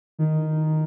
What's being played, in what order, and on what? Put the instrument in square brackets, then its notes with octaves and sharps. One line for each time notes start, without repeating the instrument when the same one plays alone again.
[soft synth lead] D#3